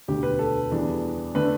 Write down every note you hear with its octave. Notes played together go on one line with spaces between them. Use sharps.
E1 D2 D3 G4
B4
A4
E2 E3 G3 D4
D3 A3 D4 B4